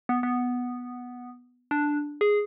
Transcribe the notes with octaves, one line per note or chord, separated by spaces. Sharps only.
B3
B3
D4
G#4